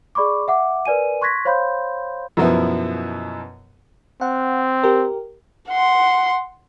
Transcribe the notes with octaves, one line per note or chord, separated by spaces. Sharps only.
G#4 D5 B5 C#6 D6
E5 F#5 D6
A#4 B4 D5 G#5 D#7
C6 C#6 F#6 G#6 A#6 B6
C5 C#5 F5 B5 C6 G6
F#2 B2 F3 B3 E4
C4 F#5
G4 A#4
F#5 C6